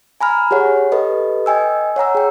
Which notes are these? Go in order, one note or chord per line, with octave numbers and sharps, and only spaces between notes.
G#5 A#5 B5 F6
G4 G#4 C#5 F#5
G4 A4 B4 D#5
D#5 G5 G#5 E6
C#5 F#5 A#5 E6
G#4 G5